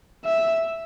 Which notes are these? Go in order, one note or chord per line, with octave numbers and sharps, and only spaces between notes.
E5